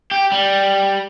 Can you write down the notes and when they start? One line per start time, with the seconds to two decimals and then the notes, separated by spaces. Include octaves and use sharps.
0.11 G4
0.32 G3